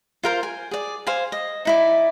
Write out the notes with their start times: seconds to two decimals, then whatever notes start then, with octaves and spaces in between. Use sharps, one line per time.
0.23 F4 A#4 C5
0.43 G#5
0.71 G#4 D5
1.07 C5 F5 G#5
1.32 D#5
1.65 D#4 E4 D5